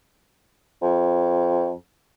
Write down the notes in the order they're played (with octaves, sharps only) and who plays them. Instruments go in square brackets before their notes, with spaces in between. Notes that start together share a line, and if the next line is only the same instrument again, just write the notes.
[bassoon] F2